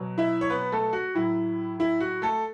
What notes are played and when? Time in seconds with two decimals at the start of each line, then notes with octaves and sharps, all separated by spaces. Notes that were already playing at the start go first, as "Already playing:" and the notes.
Already playing: B2 F#3
0.18 E4 E5
0.41 C#5
0.50 B3 B4
0.72 A3 A4
0.93 F#4
1.15 A2 F#3 E4
1.80 E4
2.00 F#4
2.22 A3 A4